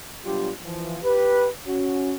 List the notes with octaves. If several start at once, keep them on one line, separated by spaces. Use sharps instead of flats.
B2 F#3 G3 D4 F4 G4
E3 F3
G4 B4
C#4 F#4